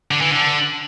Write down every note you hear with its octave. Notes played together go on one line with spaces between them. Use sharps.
D3
E3
D3